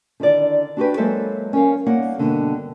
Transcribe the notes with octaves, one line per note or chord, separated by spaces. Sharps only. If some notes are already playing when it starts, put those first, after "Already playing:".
D3 D#3 E4 D5
D4 F#4 G4 B4
F#3 G#3 A#3 A4 C5 E5
C#4 A#4 F5
G3 A#3 D#4 C#5 F#5
G2 B2 D3 A#3